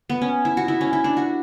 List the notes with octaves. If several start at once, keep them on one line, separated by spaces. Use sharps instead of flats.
B3
C#4
E4
F#4
E4
C#4
E4
D4
F#4